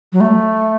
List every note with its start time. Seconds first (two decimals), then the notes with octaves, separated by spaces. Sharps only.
0.13 F#3
0.20 A3